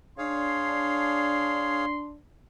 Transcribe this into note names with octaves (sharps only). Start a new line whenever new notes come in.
D4 G#4 C#5 F5 C6